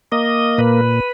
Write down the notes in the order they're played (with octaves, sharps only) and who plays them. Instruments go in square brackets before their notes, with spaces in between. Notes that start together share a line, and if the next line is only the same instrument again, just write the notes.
[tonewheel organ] A#3 D#5
A#2 B4